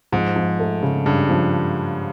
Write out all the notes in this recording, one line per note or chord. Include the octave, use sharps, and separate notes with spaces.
G#2 F3
F3
A3
C#3
G2 C#3
F3